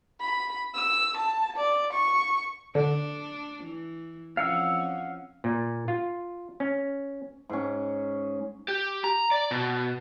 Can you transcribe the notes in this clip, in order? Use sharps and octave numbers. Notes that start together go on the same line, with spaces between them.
B5
E6
A5
D5
C#6
D3 D4
E3
F2 C#4 F5 F#5 E6
A#2
F4
C#4
G#2 C#4
G4
A#5
D5
B2